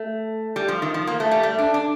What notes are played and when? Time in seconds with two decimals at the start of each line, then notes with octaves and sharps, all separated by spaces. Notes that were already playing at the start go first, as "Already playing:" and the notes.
Already playing: A3
0.56 G3
0.68 F3
0.82 D#3
0.94 F3
1.07 A#3
1.20 A3
1.31 G3
1.43 A3
1.59 D4
1.74 D4